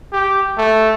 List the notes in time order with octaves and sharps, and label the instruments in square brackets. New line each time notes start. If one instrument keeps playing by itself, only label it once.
[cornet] G4
A3